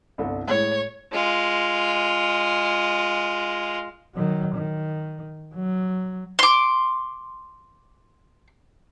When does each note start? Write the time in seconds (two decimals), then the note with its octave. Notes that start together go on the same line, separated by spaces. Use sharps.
0.18 G1 C2 A4
0.48 A2 G#3 C#5
1.13 G#3 F4
4.15 D#3 F#3
4.55 D#3
5.54 F#3
6.39 C6 D6